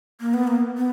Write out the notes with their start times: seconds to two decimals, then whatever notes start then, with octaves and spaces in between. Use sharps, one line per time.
0.21 A#3
0.34 B3
0.47 A#3
0.77 B3